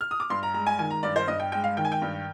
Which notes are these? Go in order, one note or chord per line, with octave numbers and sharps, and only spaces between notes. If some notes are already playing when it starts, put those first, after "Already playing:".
F6
D#6
D6
G2 C6
A#5
G#3 A#5
G#5
D#3 G#5
A#5
G2 D5
C5
G2 D#5
G5
G#3 G5
F5
D#3 G5
G#5
G5
G2